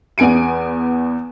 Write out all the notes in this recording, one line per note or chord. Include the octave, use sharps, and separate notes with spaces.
E2 B3 G#5 D7 D#7